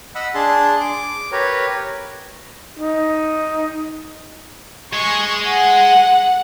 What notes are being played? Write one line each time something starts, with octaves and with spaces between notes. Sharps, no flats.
D#5 F#5 B5 E6
D4 G#4 A5 C6
D6
G4 A#4 B4 C#5
D#4
G#3 G#4 C#6
F#5